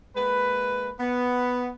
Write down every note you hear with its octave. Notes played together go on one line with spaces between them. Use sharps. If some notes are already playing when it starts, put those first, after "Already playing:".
G#3 A#3 B4
B3